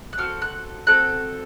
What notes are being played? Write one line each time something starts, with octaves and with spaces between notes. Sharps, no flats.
F#6
C4 F#4 A4 F6
F#6
C4 F#4 A4 F#6